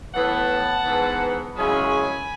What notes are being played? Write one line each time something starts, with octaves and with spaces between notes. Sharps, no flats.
A2 E3 B3 E4 F#5 A5
G#2 E3 B3
F#2 C#3 G#3 C#4 E4 G#5 B5